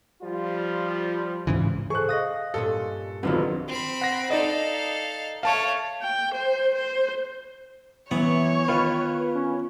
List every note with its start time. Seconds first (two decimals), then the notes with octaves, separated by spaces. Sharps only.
0.22 F3 G3 F4
1.47 G#2 C#3 E3
1.90 G#4 A4 C5 C#6 F#6
2.09 D#5 F5 D#6 A#6
2.54 G2 A#2 C#4 A4
3.23 F1 A#1 D3 D#3 F#3 B3 C4 F4
3.68 C4 B5
4.01 F#5 A#6
4.30 D#4 A4 D5 D#5 F5
5.43 A3 C#5 F5 A5 C#6
6.02 G5
6.35 C5
6.75 C5
8.11 E3 F#3 B3 C#5 F#5
8.68 D#3 F4 B4
9.35 C#4